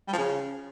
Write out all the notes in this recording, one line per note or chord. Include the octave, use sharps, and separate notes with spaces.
G3
F3
C#3